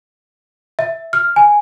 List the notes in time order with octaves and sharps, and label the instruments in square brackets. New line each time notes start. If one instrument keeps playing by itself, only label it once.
[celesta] E5
F6
G#5